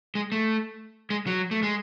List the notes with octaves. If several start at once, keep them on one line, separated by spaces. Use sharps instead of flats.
G#3
A3
G#3
F#3
A3
G#3